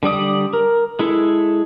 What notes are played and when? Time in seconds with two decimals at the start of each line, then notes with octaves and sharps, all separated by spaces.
0.03 D3 G3 D5 D#6
0.53 A#4
0.99 G#3 E4 A4